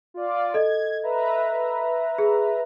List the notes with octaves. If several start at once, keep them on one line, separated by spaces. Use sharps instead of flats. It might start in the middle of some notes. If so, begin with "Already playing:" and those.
F4 D5
A4 D#5 G#6
B4 E5 A#5
G#4